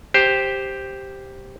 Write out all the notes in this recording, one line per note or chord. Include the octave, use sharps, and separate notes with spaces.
G4 C5